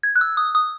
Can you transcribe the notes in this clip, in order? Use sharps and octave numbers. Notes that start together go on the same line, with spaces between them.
G#6
F#6
E6
D#6
D#6